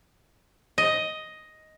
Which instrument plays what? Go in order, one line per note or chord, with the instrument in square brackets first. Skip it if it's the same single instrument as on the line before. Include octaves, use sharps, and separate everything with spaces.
[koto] D#5